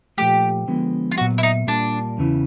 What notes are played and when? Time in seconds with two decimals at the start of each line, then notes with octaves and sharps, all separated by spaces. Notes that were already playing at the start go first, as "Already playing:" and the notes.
0.18 A#2 F3 A3 G4
0.67 D3 F3 G#3 B3
1.11 F4
1.17 A#2 F#3 B3 F#4
1.38 E4
1.43 D#4
1.67 A#2 G3 A#3 D4
2.18 E2 C#3 E3